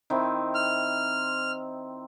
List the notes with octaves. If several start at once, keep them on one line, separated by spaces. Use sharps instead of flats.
D#3 C4 E4
F6